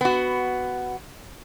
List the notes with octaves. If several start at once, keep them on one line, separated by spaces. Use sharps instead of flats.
B3 F#4